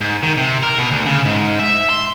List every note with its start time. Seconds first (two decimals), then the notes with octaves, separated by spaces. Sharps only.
0.01 G#2
0.23 D#3
0.38 C3
0.63 A#4
0.78 B2
0.91 D2
1.06 C#3
1.25 G#2
1.59 E5
1.89 C6